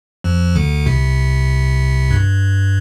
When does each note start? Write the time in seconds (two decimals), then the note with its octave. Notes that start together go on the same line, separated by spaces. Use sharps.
0.24 F2 F3
0.55 D2 D3
0.86 C2 C3
2.11 G2